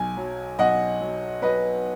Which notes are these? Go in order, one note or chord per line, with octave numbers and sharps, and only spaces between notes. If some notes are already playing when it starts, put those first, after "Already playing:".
Already playing: B1 G#5
F#3
B1 D#5 F#5
F#3
F#3 B4 D#5